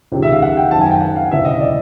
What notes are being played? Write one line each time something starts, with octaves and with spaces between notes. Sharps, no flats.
C#2 C3 D#3
E5
F5
F#5
G5
F#1 F#2 D#3 A5
G#5
G5
F#5
F5
E1 D2 C#3 E3 E5
D#5
D5